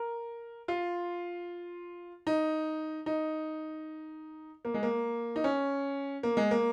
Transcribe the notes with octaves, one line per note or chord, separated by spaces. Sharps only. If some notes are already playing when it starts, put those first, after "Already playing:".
Already playing: A#4
F4
D#4
D#4
A#3
G#3
A#3
D#4
C#4
A#3
G#3
A#3